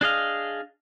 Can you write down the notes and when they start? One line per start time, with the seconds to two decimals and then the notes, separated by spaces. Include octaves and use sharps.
0.01 D4 G#4 D#5 F5